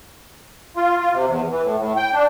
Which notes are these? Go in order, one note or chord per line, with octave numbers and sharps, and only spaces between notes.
F4
F4
C3
E2
E3
A2
A2
G5
D4